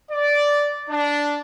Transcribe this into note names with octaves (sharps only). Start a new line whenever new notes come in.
D5
D4